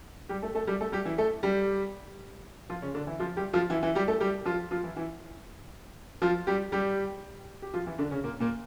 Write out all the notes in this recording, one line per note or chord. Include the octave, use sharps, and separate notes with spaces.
G3 G4
A3 A4
A3 A4
G3 G4
A3 A4
G3 G4
E3 E4
A3 A4
G3 G4
F3 F4
C#3 C#4
D3 D4
E3 E4
F3 F4
G3 G4
F3 F4
E3 E4
E3 E4
G3 G4
A3 A4
G3 G4
F3 F4
F3 F4
E3 E4
E3 E4
F3 F4
G3 G4
G3 G4
G4
F3 F4
E3 E4
D3 D4
C#3 C#4
A#2 A#3
A#2 A#3